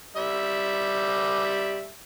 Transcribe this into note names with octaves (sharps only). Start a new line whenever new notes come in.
G3 E5